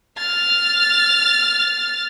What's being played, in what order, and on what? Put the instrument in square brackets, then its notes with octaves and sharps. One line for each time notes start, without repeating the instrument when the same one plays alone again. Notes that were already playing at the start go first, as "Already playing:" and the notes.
[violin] F6 A6